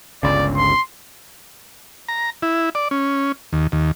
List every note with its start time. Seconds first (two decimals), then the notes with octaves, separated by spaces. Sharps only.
0.23 G1 C#2 C#3 D5
0.56 C6
2.09 A#5
2.42 E4
2.75 D5
2.91 C#4
3.53 D#2
3.72 D#2